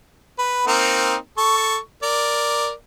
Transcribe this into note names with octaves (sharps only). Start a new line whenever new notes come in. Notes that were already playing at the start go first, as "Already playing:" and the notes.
B4
A#3 C4 D#4
A4 C#6
A#4 D5